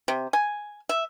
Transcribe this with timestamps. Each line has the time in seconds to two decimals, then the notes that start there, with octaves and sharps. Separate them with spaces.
0.08 C3
0.33 G#5
0.89 E5